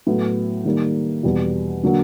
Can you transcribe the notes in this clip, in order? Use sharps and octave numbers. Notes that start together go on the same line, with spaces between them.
A2 F#3 B3
D#3 G3 A#3
E2 B2 G3
D3 F#3 A#3